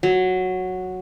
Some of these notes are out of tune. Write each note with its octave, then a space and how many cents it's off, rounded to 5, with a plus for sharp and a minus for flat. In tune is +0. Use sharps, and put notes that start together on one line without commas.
F#3 -5